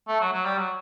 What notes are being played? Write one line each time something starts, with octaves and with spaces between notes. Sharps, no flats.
A3
F#3
F#3
G3
F#3